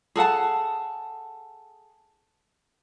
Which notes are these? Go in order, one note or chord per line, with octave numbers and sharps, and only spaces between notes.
G#4 A4 F#5 A5